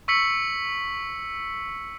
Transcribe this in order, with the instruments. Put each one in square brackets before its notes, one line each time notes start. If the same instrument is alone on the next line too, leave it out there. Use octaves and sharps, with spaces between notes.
[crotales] C#6 E6 B6 C#7 F#7